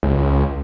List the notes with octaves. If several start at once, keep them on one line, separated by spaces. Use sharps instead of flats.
C#2